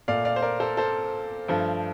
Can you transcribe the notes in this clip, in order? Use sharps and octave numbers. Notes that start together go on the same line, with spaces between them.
A#2 A3 D5 F5
D5 F5
C5
A#4 D5
A4 C5
A4 C5
G2 F3 A3